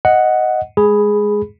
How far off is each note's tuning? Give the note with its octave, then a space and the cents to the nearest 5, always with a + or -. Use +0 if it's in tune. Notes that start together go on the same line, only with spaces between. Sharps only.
D#5 +0 F#5 +0
G#3 +0 G#4 +0 B5 +0